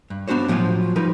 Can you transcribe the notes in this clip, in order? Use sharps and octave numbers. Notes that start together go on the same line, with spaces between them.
G2
B3 D4 F#4 C5 C#5
A2 F3 F#3 F4 G#5
F3 G3 D#4 A#4 B4